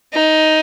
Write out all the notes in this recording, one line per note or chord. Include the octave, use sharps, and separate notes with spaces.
D#4